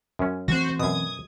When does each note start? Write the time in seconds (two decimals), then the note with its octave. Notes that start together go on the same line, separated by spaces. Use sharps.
0.19 F#2 C#4
0.48 E3 A3 C4 F#4 C5
0.79 F#2 B2 D#6 G#6